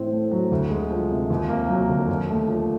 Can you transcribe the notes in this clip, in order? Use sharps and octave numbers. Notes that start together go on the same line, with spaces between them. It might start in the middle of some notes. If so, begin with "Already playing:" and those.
Already playing: A2 E3 C4
A3
F#3
D2
G#3
F3
C3
D#2
A#3
F#3
D3
D#2
A3
F3